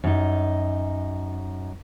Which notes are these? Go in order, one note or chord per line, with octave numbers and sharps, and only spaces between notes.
F#2 D#4